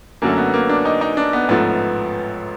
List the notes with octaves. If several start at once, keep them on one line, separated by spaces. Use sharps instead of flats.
F#2 D3 F#3 A3 A#3
B3
A#3
D4
D#4
D#4
D4
B3
A1 G#2 F3 A3 B3